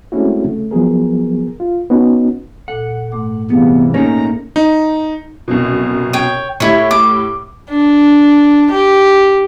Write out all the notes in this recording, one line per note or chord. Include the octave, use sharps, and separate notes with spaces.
G#3 A3 C4 C#4 E4 F#4
C#3 A3
F3 F#3 B3 G#4 A#4
F4
B3 C#4 D#4 F#4
A#2 A4 F#5
G#2 A3 D6
C3 E3 G3 B3 G#4 F5
A3 A#3 C#4 D#4 A4 A#4 A#5
D#4
C2 F#2 B2
C#5 G5
A2 E4 G4 C#5
D6
D4
G4